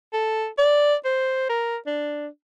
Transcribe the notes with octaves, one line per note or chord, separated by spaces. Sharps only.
A4
D5
C5
A#4
D4